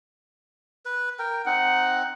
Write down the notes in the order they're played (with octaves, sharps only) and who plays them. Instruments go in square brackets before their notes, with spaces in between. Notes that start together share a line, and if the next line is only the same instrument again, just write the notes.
[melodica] B4
A#4 G5
[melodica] C4 D#4 [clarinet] F#5